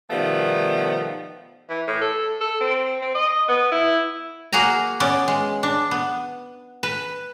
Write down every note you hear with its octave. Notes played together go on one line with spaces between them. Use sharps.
B2 D#3 F3 G3 A3 B3
E3
A2
A4
A4
C4
C4
D#5
B3
E4
A#3 F#4 G#4 G#5 A#5
B3 C#4 D5
G#3
D4
B3
B4